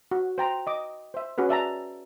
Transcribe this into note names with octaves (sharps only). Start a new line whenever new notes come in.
F#4
C5 G5 A#5
D#5 D6
C5 E5
C#4 F#4 G#4 B4
D5 E5 A5 A#5